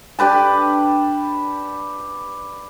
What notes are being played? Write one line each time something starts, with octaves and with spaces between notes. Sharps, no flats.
D4 G4 B4 A5